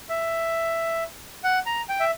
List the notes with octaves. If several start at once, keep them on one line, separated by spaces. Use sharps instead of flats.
E5
F#5
A#5
G5
E5